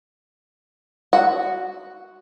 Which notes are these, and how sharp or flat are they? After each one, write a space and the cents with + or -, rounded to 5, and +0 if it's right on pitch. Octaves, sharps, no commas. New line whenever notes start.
F#4 +0 F#5 +0